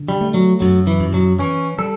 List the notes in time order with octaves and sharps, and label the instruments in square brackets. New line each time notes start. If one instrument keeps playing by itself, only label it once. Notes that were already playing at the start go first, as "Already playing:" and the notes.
Already playing: [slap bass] D3
[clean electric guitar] G3
[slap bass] A3
[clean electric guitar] F#3
[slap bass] F#2 [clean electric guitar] F#3
[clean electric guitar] E3
[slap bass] F#2
[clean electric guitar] F#3
[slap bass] E3 [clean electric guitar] C#4
[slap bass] G3 [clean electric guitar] A4